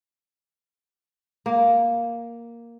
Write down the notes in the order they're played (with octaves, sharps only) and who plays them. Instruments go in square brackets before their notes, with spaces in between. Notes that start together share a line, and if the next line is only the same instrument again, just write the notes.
[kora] A#3